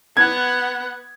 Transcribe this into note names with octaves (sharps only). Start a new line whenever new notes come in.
B3 F#5 G#6